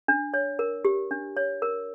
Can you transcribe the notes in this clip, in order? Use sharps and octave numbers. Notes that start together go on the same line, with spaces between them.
D4
C#5
A#4
G4
D4
C#5
A#4